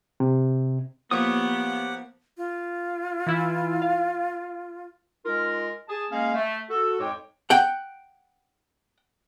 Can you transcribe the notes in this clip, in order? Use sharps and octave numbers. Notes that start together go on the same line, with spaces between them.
C3
F3 A#3 B3 G4 C#5 F#5 D#6
F4
E3 E4
F5
G#3 D#4 F4 A#4
G#4 A5
G#3 A#3 C#4 G#4 F5
A3
F#4 A4
F2 G#2 G#3 C#5 G5 D6
F#5 G5